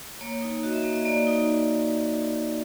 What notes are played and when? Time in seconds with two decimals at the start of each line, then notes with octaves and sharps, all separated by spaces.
0.21 A#3 C#5
0.42 D#4
0.63 F#4 D#5
0.73 E5
0.82 A#3 D#5
0.96 D#5
1.05 A#3 D5
1.27 D#4